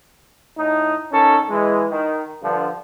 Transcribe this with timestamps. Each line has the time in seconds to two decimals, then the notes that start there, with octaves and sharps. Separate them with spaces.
0.57 A2 D#4
1.12 D#3 C#4 A4
1.49 E3 G#3
1.91 D#3
2.43 G2 D3 F3